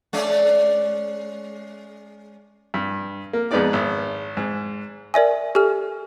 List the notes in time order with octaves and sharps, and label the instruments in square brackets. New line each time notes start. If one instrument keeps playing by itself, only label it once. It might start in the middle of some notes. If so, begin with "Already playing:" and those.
[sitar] G#3 C#4 D5
[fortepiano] G2
A#3
F2 G#3 B3 D#4 D5 D6
G#1
G#2
[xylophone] A#4 D5 E5 G#5
G4 A4 G#5 F6